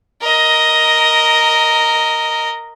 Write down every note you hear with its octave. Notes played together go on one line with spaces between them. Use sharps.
A#4 D#5